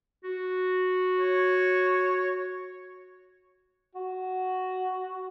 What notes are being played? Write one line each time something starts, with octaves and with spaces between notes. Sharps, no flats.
F#4
C#5
F#4